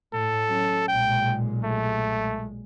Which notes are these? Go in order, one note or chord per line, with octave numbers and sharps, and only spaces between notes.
A2 A4
F#3 C#4
B1 A#2 G#3 G5
A3